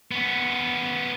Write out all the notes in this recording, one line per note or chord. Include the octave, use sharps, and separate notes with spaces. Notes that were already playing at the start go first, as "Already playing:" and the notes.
B3 C#4